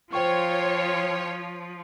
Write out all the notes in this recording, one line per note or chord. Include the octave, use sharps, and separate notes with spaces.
F3 F4 C5 C#5 G5 C#6